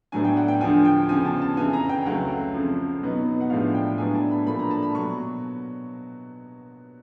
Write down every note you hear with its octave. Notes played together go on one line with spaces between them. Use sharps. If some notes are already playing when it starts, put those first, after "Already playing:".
A2 F#3 B3 D4 G#5
G5
F#5
G5
D2 D3 F3 G#5
G5
E2 C#3 F3 G#5
A5
A5
F2 C#3 E3 G#5
A#5
G5
C#2 C#3 F#3 A3 F#5
F2 C#3 F3
B2 F#3 B3 D#4
F#5
A2 F3 G#3 B3 D4 F5
G5
A2 F#3 B3 D4 G#5
A5
B5
A#2 F3 A3 D4 B5
A#5
A5
B5
B2 F#3 C#6